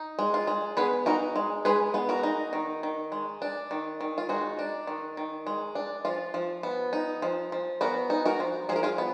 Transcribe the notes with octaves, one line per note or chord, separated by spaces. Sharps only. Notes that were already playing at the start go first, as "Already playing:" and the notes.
Already playing: D#4
G#3
F4
G#3
B3 G#4 B4
D#4 F#4 A#4
G#3
G#3 G#4 B4
B3
F#4 A#4
D#4
D#3
D#3
G#3
D4
D#3
D#3
F4
G#3 D#4 F#4
D4
D#3
D#3
G#3
D4
F3 F4
F3
B3
D#4
F3
F3
B3 F#4 A#4
D#4
F#4 A#4
F3
F3 G#4
A#4
F4 G#4
B3